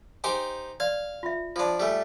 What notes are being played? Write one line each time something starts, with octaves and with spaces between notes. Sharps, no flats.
D#4 G4 C5 G#5
D5 F5
F4 E5
F3 D4 F4 D5 A5
G3 A3 G#5 D#6